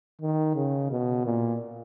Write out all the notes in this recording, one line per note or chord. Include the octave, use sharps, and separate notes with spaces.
D#3
C#3
B2
A#2